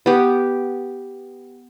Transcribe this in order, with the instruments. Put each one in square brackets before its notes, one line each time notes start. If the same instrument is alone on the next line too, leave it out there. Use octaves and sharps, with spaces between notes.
[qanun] B3 G4